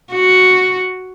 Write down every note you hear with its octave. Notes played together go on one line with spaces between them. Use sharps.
F#4